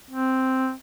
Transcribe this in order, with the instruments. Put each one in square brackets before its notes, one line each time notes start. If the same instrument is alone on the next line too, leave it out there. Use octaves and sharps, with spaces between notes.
[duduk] C4